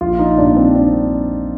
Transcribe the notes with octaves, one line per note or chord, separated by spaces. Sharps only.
A#1 F4
D#4
A#2 G3 A#3 D4
C4
D4